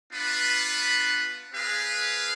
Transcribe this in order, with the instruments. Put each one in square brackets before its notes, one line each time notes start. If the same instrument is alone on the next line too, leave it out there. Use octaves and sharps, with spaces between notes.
[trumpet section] B3 D4 F4 B4
C4 G#4 B4 F5